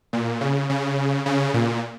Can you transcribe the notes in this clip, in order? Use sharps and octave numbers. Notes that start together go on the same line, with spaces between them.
A#2
C#3
C#3
C#3
A#2